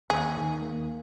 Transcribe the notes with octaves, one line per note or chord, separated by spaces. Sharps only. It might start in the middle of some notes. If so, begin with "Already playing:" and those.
D#2 G#4
D#3
A#3